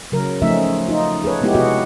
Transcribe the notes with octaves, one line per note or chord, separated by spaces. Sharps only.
C#3 F#3 A#4
C#3 F3 A3 C#4 D#4 E5
D#4 F4
G#4 A4 B4 C#5
G#3 B3 D#4 E4 G4
C3 B3 F#4 G#4